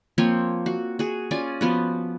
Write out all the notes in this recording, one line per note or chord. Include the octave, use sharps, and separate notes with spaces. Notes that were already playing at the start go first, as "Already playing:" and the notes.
F3 A#3 C4 C#5
F#4
F#4 G#4
C#4 F4 D5 G#5
F3 B3 F#4